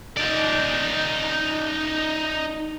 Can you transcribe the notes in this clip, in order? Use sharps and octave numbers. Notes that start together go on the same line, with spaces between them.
D#4 D5